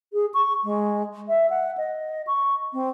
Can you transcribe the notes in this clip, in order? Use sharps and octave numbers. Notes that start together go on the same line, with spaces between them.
G#4
C#6
G#3
E5
F#5
D#5
C#6
C4